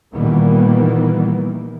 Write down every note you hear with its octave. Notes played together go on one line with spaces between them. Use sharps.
A#2 D#3 E3 G3 A#3 B3